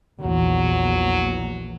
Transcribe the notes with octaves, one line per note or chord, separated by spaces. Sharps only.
A#1 E2 A#2 F#3